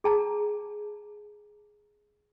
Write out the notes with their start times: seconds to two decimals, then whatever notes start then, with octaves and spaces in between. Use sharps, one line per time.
0.04 G#4 A5 A#5